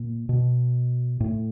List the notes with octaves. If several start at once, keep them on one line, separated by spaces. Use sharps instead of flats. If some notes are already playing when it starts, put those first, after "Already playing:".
Already playing: A#2
B2
A2